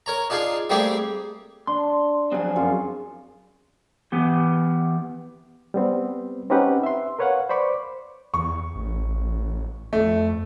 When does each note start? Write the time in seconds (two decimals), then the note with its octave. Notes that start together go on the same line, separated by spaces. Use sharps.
0.06 A#4 C#5 A#5
0.30 D4 D#4 F4 G#4 F5
0.70 G3 A3 A#3 C4 G4 G#4
1.67 D4 C6
2.32 F3 F#3 C4 G#4 G#5
2.56 F#2 F4
4.12 E3 B3 G4
5.74 G3 B3 C4
6.50 C4 C#4 D#4 G4 B4 F#5
6.83 E5 C6
7.19 A#4 B4 C#5 F5 F#5
7.49 C5 D5 B5 C#6 D6
8.34 E2 C#6
8.75 A1
9.93 F2 A3